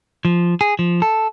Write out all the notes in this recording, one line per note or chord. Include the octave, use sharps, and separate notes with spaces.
F3
G#4
F3
A4